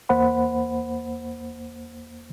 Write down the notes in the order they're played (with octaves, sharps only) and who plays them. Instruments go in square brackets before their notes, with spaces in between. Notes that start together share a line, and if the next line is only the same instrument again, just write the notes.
[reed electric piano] E2 A#3 C5 F#5 B5